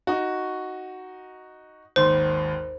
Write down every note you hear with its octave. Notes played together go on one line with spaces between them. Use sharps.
D#4 F#4
G#1 D#2 C5 C6